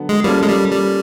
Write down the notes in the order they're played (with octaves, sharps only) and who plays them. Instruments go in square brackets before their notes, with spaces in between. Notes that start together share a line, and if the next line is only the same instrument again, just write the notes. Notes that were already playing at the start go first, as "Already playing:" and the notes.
Already playing: [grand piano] D3 F#3 B3 A4
[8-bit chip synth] G#3
[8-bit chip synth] G3 [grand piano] A#3 C#4 F4 A4
[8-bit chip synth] G#3
G3
G3